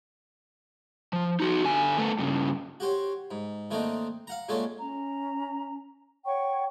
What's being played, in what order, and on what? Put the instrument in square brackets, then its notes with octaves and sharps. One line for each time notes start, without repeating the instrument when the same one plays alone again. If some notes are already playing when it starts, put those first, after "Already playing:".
[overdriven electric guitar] F3
D#4 F#4
D3 G#5
A3 B3
G2 C#3
[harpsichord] F#4 G4 C5 C#5
G#2
D#3 A3 A#3 C4 D4 D#4
F5 F#5 A#5
A#2 G#3 A3 C4 C#4 A4
[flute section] C#4 A#5
C#5 F#5 G5 C#6